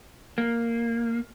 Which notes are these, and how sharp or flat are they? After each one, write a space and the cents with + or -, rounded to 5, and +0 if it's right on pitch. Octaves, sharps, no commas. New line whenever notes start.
A#3 -5